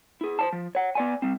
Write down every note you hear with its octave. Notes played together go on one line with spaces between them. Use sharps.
E4 G#4
C5 C#5 A5
F3
C#5 F#5
B3 D5 G#5
G3 C4